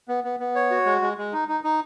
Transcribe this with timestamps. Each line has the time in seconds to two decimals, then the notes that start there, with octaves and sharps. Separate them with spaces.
0.08 B3
0.24 B3
0.40 B3
0.55 C#5
0.71 F#4
0.86 G#3
1.02 G#3
1.18 G#3
1.33 D#4
1.48 D#4
1.64 D#4